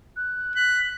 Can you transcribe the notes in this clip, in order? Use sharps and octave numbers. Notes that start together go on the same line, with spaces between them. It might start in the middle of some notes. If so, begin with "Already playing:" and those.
F#6
F#6 B6